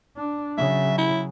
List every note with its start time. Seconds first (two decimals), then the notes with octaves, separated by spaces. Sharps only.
0.17 D4
0.58 C#3 F#3 E5
0.98 E4